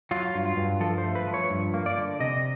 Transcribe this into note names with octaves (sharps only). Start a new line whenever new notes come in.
F#3 F4
G2
F4
G2
F3 A4
C5
A3
B4
F3
C#5
G2
A#3
D5
D3
C3 D#5